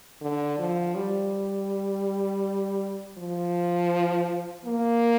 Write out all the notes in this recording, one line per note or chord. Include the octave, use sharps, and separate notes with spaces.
D3
F3
G3
F3
A#3